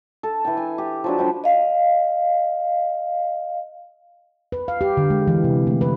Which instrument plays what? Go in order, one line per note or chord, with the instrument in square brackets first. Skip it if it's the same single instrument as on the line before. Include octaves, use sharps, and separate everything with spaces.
[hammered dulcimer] A4
E3 G5
G#5
G4
F3 F#3 D4
D3 F3 G3 G5
[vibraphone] D#5 F5
[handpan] B4
F5
G4
D3
G#3
E3
C3
A3
B4